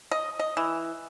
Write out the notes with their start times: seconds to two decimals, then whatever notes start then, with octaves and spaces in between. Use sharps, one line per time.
0.11 D#5
0.39 D#5
0.57 E3